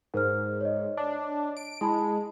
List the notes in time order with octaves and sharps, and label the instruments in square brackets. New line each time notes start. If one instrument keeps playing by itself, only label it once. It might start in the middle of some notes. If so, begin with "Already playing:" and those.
[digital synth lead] G#2 [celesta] A#4 C5 F6
[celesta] C#5 D#5
[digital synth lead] D4
D7
[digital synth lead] G#3 [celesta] E4 A5 B5